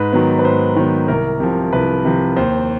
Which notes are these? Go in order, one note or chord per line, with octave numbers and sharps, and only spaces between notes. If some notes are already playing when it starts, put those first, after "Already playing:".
Already playing: G#2 B4
D#3 F#3 B3
B4
G#2 C5
D#3 F#3 B3
C2 A#4
C3 F3
C2 B4
C3 F3
D#2 C5